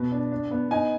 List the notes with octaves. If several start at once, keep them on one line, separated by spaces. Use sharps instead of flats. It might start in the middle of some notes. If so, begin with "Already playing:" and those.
Already playing: B2 B3
D4
D4
B3
D#4 G#5